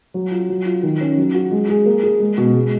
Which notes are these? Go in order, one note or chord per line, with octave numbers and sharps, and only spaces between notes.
F#3
F4
F#3
F4
D#3
C#4
F#3
F#4
G#3
G#4
A#3
G#4
G#3
B2
G#3